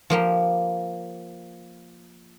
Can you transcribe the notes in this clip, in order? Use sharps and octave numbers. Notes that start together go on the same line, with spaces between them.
F3 A#3 G4